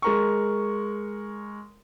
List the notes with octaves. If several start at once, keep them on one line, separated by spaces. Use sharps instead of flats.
G#3 A#4 C#6